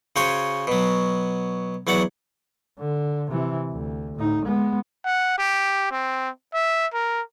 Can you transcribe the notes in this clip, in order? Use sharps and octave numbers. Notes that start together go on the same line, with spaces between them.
C#3 F#4 C5 C#5 G#5
B2 F#3
E2 F#3 D5 F#5
D3
C3 E3
D2
A2 D#4
G#3 B3
F#5
G4
C4
E5
A#4